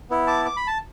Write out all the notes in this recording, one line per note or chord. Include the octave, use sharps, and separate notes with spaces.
B3 E4
A5 D6
D6
B5
A5